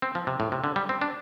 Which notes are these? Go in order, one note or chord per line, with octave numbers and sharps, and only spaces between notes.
C4
F3
C3
A2
C3
D3
G3
C4
D4